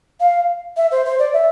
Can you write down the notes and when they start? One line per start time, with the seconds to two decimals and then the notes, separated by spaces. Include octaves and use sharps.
0.20 F5
0.77 E5
0.91 C5
1.05 C5
1.19 D5
1.33 E5